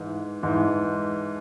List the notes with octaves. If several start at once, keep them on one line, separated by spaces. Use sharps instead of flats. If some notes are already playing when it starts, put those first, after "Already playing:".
Already playing: G#2 E3
G#2 E3